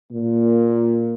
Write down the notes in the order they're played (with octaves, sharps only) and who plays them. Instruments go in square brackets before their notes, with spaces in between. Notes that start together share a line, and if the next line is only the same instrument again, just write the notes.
[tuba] A#2